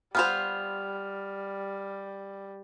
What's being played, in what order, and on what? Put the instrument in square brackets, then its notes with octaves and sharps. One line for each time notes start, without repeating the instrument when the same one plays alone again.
[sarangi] G3 [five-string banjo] B3 F4 C5 [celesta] F6 F7